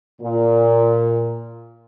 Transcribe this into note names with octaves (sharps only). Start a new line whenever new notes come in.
A#2